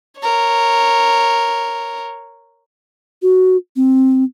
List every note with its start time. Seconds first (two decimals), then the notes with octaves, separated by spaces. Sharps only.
0.19 A#4 C#5
3.22 F#4
3.76 C4